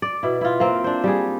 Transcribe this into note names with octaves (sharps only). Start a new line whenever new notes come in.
D5
B2 E4
E4 F4
A#3 C4
D4 C5
G3 G#4